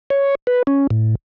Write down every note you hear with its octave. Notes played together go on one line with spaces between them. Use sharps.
C#5
B4
C#4
A2